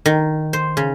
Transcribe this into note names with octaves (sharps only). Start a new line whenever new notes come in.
D#3
C5
C#3